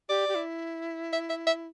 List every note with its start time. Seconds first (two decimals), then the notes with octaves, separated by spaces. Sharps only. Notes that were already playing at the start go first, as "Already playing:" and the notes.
0.09 G4 D5
0.28 G4
0.35 E4
1.13 E5
1.30 E5
1.47 E5